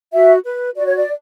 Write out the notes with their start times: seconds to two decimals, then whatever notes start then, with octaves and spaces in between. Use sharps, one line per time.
0.13 F#4 E5
0.44 B4
0.76 F#4 D5
0.86 C#5
0.97 D5